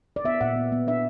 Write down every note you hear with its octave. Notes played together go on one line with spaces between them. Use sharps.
D5
B3 E5
A#2 F#5
B3
B3
D4 E5